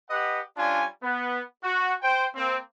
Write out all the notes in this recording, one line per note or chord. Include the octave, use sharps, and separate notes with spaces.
G4 B4 D#5 F#5
G3 C#4 D4 F4 G#5
B3
F#4
C5 G5
A#3 C4